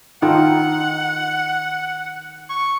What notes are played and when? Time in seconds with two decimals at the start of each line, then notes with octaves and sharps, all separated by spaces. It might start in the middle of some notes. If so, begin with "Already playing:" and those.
0.22 D#3 D#4 F4 A4 F#5
2.49 C#6